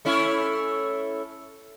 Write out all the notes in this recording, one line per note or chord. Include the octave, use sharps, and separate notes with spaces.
A3 C#4 E4